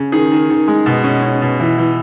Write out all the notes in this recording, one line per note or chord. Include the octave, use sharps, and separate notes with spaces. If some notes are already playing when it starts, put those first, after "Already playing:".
Already playing: C#3
D#3 G#4
D#3
D#3
G#3
B2
C#4
C#4
B2
E3
E3